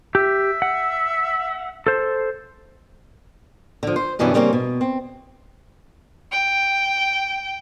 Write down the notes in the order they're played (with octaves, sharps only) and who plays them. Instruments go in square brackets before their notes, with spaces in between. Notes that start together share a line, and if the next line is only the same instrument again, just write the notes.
[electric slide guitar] G4 [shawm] E5
[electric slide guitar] F#5
A4 C5
[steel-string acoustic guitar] D3 F3
C5
F#2 B2 E3 G3 C#4 D4
C#3 G3 A#3 C4 C#4
B2
C4
[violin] G5